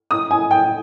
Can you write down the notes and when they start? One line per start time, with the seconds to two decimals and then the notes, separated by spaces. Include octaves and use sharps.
0.11 D#6
0.31 G#5
0.51 G5